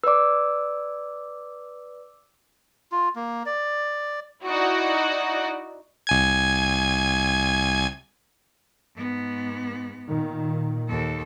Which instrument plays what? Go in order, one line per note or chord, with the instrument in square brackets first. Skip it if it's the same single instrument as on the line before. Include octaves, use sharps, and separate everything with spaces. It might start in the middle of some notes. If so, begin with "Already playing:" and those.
[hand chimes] B4 D5 [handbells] D6 E6
[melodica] F4
A#3
D5
[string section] D#4 E4 F#4 D5
[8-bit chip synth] C2 G#5 G#6
[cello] G#2 B3
[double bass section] A#2 D#3
[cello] D#2 A4